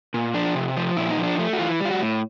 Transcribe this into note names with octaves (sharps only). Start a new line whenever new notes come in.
A#2
F3 D4
C3
F3
A#2 E4
D#4
F3
D4
D#4
A3
F#4
E3 F4
G3 F4
F#4
A2